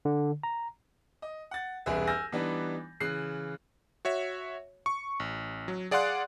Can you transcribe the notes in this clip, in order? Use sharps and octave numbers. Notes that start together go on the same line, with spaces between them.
D3
A#5
D#5
F#5 A6
E1 C2 G#4 B4 E5
G#5 E6 F6 G6 A#6
E3 G3 B3 D4 D#4
C#3 E3 F#6 C7
F#4 C#5 E5
C#6
A1
F#3
G#4 D5 F5 F#5 C6 F#6